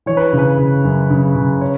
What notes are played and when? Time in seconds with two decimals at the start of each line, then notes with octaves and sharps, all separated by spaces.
0.06 E3 C#5
0.17 B4
0.33 C#3
0.39 B4
0.58 C#3
0.84 F#2
1.10 C#3
1.35 C#3
1.61 C#5